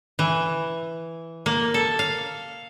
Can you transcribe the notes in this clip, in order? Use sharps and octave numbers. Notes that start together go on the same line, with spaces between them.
E3
A#3
A4
F5